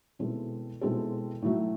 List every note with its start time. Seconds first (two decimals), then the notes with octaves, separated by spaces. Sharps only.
0.19 B2 G#3 C4 E4 A4
0.81 B2 G#3 C4 E4 A4
1.42 A2 F#3 A3